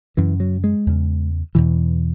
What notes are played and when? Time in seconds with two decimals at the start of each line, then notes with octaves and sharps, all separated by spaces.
0.17 F#2 C#3 E3
0.40 F#3
0.64 G#3
0.86 E2 C#3
1.55 E2 B2 E3